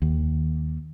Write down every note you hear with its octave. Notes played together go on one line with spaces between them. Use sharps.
D#2